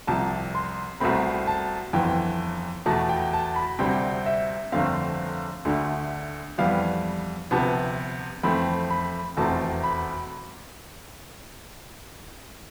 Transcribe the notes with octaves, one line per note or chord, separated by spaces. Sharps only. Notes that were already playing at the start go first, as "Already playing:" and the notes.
C2 C3 F3 A5
C6
C2 B2 A3 C4 B5
A5
G1 F2 E3 B3 G5
E2 B2 A3 A5
G5
A5
B5
D2 C3 G3 C4 G5
E5
G1 F2 D3 A3 C4 F5
D2 D3 A3
F2 E3 G3 B3 F5
D2 C3 F3 B3 A5
F2 E3 A3 C4 B5
B5
F1 E2 B2 A3 C4 A5
B5